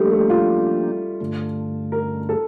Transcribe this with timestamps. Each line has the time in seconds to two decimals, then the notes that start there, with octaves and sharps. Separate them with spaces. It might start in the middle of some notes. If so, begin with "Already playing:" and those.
Already playing: F3 G3 A3 A#3 D4 G4
0.12 A3
0.30 F4
1.21 G2 D3 A3
1.92 A#4
2.29 A4